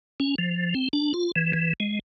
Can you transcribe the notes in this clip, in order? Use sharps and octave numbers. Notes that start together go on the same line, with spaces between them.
C#4
F3
C4
D4
F4
E3
E3
G#3